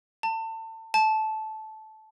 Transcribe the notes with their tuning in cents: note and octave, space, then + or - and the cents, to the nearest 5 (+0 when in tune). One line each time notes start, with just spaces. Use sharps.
A5 +30
A5 -15